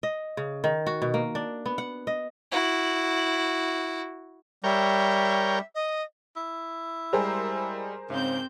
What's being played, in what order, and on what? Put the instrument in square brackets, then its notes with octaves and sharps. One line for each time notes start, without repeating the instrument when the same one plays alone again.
[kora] D#5
C#3
D#3
F#4
B2
A#3
D4
B3
F#5
D#5
[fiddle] E4 F#4
[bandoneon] G3 [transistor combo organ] A#4 C#5 G5 [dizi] E5
[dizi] D#5
[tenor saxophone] E4
[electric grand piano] G3 G#3 G4 [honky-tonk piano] G#4 A#4 C5
[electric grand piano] G#2 [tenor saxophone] C#3 [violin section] C4 G6